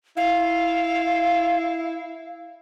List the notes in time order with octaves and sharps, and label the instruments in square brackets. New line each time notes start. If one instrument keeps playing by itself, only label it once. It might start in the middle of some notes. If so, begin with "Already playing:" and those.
[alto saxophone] E4 [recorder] F5